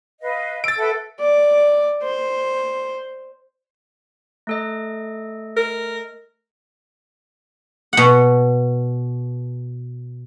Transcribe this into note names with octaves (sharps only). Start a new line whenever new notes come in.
B4 D#5 F5
E6 A6 D7
A4 B4 E5 F#5
D5
C5
A3 A4 D#5
A#4
B2 F#5